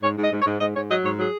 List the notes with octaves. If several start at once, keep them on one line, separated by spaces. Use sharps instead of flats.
G#2 C#5
G#2 D#5
G#2
C#5
G#2
G#2 D#5
G#2 C#5
F#3 D#5
G#2 C#5
F#3 G#4